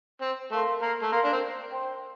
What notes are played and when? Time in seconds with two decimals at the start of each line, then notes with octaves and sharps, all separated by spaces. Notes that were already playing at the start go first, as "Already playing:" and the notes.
0.21 C4
0.52 A3 A#4 F5 C6
0.82 A#3
1.02 A3
1.11 A#3 A#4 F5 C6
1.24 D4
1.32 C4
1.71 C5 G5 C6